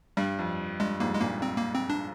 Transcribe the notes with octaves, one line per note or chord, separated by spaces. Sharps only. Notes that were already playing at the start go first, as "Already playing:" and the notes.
G2 G3
F2
G2 G#3
F2 G#2 A#3
G#3
G2 A#2 A#3
C4
A#3
C4
D4